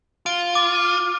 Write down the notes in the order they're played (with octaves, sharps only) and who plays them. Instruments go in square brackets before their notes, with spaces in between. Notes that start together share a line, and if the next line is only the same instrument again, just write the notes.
[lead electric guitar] F4 [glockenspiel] D7
[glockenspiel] D6